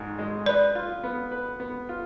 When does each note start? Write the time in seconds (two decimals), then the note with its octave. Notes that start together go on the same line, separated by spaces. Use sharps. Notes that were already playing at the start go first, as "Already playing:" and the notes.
Already playing: G#1 G#2
0.19 G#3
0.46 B4 D5
0.75 F4
1.03 B3
1.32 B4
1.60 B3
1.89 F4